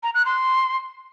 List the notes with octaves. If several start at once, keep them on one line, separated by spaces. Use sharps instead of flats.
A#5
F#6
C6